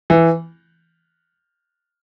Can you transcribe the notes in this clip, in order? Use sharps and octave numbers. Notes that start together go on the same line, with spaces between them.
E3